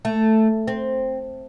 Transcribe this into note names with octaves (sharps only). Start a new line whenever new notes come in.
A3
C4